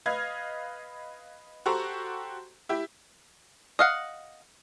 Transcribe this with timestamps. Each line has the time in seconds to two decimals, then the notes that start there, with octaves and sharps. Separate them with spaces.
0.06 B4 D#5 F5 F6 G#6
1.66 F#4 G4 A4 C5 A#5 C#6
2.69 E4 G4
3.79 D#5 F5 F#5